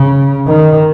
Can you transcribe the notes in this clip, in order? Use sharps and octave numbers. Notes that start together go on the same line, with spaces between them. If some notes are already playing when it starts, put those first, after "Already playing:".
Already playing: C#3
D#3